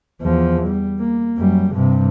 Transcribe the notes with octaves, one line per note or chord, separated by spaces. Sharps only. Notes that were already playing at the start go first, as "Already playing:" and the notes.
E2 F3
G3
A#3
F#2 G3
G2 C3